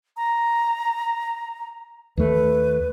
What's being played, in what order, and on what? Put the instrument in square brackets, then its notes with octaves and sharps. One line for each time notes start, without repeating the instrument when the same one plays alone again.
[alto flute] A#5
[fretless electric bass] D#2 A3 [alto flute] B4